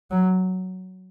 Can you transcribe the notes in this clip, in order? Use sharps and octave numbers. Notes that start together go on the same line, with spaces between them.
F#3